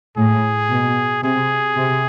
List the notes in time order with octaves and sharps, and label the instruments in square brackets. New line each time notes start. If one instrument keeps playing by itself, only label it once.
[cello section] A2 [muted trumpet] G#4
[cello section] B2
[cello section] C3 [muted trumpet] G#4
[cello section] C3